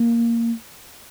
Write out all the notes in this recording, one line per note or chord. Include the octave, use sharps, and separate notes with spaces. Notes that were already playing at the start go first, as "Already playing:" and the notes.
Already playing: A#3